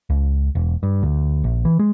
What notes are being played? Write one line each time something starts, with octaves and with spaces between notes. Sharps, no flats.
C#2
E1
G2
D2
A#1
E3
G#3